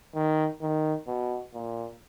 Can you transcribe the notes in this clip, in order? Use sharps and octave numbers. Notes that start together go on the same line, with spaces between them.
D#3
D#3
B2
A#2